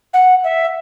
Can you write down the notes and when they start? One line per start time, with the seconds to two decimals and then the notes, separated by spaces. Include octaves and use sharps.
0.13 F#5
0.44 E5